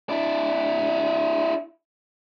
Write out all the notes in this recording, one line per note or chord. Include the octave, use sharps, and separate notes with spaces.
D4 E4